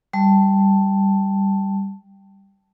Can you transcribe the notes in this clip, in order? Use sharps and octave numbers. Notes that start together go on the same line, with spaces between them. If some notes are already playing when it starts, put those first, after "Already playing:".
G3 A5